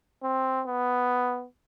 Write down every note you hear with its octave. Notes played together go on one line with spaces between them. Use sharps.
C4
B3